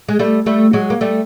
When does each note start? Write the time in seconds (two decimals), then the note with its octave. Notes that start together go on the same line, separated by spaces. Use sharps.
0.09 G#3
0.19 G3 A3
0.46 G3 A3
0.73 F#3 G#3
0.90 A#3
1.01 G3 A3